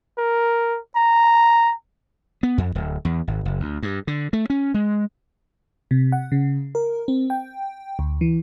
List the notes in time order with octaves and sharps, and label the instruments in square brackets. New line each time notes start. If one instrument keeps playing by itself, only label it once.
[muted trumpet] A#4
A#5
[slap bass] B3
F2
D1
E2
G#1
F#1
D2
G2
D3
A3
C#4
G#3
[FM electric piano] C3
F#5
C#3
A#4
C4
G5
D2
E3